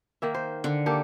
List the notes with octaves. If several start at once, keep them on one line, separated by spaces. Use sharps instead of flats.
D#3 A#3 E5
C5
D3
A#3 G4 A4